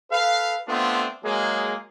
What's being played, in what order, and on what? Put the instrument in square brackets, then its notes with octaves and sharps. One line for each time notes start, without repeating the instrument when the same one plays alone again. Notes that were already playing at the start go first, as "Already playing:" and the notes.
[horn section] A4 B4 F5
A3 B3 C4 D4 F4
F#3 G#3 A#3 G#4